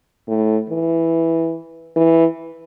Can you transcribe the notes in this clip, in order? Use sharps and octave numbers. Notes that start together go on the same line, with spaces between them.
A2
E3
E3